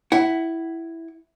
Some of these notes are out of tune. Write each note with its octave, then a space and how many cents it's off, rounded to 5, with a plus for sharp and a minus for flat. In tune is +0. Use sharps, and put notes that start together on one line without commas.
E4 +0 F#5 +30